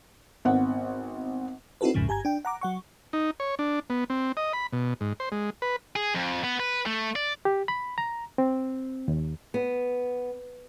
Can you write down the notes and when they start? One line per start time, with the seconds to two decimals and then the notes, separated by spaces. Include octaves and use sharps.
0.45 G#1 B3 C4 F#5
1.81 C4 D#4 E4 F#4 A4 B4
1.94 A#1 E2 G#2 C#3 F3
2.08 G1 G4 G#5 A#5 G#6
2.25 D4 G5
2.45 F#5 A#5 D6
2.61 F#3 F#5 C#6
3.13 D#4
3.40 C#5
3.59 D4
3.90 B3
4.10 C4
4.37 D#5
4.53 B5
4.73 B2
5.01 G#2
5.20 C5
5.32 G#3
5.62 B4
5.96 G#4
6.15 F2
6.44 B3
6.60 B4
6.86 A3
7.16 D5
7.45 G4
7.68 B5
7.98 A#5
8.38 C4
9.08 D#2
9.54 B3